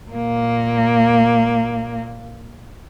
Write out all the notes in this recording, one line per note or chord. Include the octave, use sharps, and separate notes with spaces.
A#2 A#3